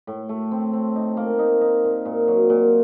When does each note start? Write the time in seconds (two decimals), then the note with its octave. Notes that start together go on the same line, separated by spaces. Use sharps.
0.07 A2
0.29 A3
0.51 C4
0.73 C4
0.96 D#4
1.17 A#3
1.39 D#4
1.61 D#4
1.84 A#2
2.05 A#2
2.28 F#3
2.50 A#2